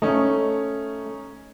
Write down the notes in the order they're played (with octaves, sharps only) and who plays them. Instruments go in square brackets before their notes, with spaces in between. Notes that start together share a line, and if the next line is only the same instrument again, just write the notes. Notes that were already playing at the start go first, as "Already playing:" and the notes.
[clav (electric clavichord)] A3 [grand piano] C#4 D#4